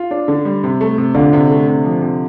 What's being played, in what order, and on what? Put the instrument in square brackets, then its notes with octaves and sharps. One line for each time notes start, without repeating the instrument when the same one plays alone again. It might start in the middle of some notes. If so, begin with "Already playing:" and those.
Already playing: [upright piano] F4
D4
D3
G3
C3
A3
C3
[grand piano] D3 [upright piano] F4
[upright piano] C3
A3
C3
F3
C3